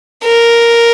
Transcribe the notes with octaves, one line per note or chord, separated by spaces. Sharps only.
A#4